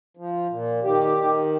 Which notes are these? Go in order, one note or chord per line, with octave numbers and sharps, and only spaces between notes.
F3
A#2
D#3 G4
D#3